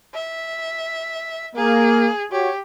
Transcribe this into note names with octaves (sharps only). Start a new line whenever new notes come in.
E5
A#3 G#4
F#4 G4 C#5